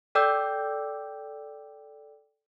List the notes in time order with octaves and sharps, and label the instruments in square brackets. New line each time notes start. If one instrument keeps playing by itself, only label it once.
[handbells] A4 D5 G5 D6 E6 G6